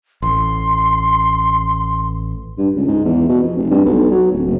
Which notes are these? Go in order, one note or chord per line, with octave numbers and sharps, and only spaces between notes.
A1 C6
G2
C#2
G#2
E2
B2
F2
F1
G2
B1
F#3
D1
F#1